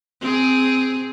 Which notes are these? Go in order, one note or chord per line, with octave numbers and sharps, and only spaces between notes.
C4 G#4